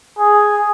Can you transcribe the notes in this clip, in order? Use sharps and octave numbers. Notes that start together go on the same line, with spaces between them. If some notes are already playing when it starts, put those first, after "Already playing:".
G#4